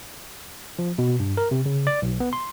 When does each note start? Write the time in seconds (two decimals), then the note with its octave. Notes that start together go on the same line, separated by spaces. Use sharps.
0.79 F3
0.98 B2
1.20 G2
1.37 A#4
1.51 C3
1.66 C#3
1.87 D5
2.02 B1
2.20 B3
2.33 C6